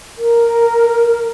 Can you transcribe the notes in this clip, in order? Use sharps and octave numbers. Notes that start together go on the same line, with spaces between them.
A#4